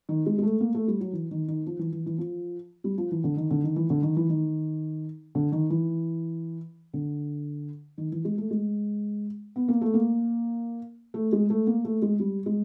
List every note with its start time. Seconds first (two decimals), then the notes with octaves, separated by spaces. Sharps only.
0.09 D#3
0.26 G#3
0.38 G#3
0.43 A3
0.60 A#3
0.75 A3
0.88 G3
1.00 F#3
1.13 E3
1.31 D#3
1.48 D#3
1.66 F3
1.79 E3
1.92 E3
2.06 E3
2.18 F3
2.84 G3
2.98 F3
3.12 E3
3.24 D3
3.37 D#3
3.51 D3
3.64 D#3
3.76 E3
3.90 D3
4.03 D#3
4.17 E3
4.29 D#3
5.35 D3
5.52 D#3
5.70 E3
6.93 D3
7.98 D#3
8.12 E3
8.25 G#3
8.38 A3
8.51 G#3
9.56 B3
9.68 A#3
9.81 A3
9.94 A#3
11.14 A3
11.32 G#3
11.50 A3
11.67 A#3
11.85 A3
12.02 G#3
12.20 G3
12.46 G#3